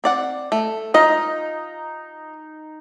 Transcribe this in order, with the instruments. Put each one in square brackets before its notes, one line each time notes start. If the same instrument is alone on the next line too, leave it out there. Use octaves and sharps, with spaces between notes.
[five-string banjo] C4 D5 F#5
A3
[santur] D#4 [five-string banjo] F4 D#5